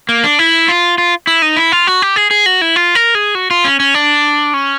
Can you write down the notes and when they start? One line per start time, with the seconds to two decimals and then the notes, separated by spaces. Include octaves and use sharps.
0.09 A#3
0.24 D4
0.39 E4
0.68 F4
0.98 F4
1.27 E4
1.42 D#4
1.57 E4
1.72 F4
1.87 F#4
2.02 G4
2.16 G#4
2.31 G#4
2.46 F#4
2.61 E4
2.76 F4
2.95 A#4
3.15 G#4
3.35 F#4
3.51 F4
3.64 C#4
3.80 C#4
3.95 D4
4.54 C#4